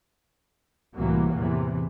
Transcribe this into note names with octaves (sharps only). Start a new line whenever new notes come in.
C2 A2 C3 E3 F#3 A#3
E2 C3 E3